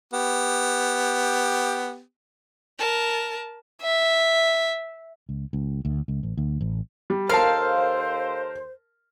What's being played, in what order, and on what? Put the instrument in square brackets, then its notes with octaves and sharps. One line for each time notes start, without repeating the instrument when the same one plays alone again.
[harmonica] B3 G4
[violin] A#4 A5
[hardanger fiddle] E5
[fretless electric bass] C#2
C#2
D2
C#2
A1
D2
A1
[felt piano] G3
[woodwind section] D#2 A4 C5 [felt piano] A#4 A5 [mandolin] F5